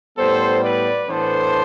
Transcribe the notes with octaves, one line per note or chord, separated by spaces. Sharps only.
A2 G3 B3 A4 C5
B4 D5
A2 E3 B3 D4 A4 C5